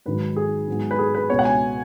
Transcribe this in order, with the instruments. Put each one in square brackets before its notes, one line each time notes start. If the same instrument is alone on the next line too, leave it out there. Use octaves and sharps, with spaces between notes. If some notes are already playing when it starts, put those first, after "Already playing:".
[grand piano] G#2 D#3 F#3 B4
G#4
G#2 F#3 B3
B4
G#4
B4
C#2 B2 B3 C#5
F#5
G#5